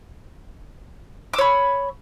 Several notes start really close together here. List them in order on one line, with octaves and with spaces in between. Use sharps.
D6 E6 C#5 B5